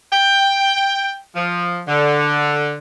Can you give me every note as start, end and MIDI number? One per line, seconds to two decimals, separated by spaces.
0.12 1.17 79
1.36 1.80 53
1.87 2.77 50